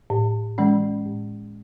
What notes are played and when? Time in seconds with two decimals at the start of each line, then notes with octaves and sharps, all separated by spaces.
0.10 A2
0.58 E3 G#3 C#4
1.06 A2